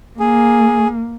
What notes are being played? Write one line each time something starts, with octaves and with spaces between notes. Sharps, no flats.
A#3 G#4